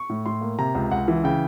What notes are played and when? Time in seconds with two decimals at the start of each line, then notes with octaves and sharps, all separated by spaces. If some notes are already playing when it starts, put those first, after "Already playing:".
Already playing: C#6
0.09 A2
0.26 A2 C6
0.41 A#3
0.59 C3 A#5
0.75 C#2
0.91 C#2 F#5
1.08 E3
1.24 C#3 G5